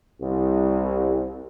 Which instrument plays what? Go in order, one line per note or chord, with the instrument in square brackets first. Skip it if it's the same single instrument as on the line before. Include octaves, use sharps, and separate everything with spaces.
[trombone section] C2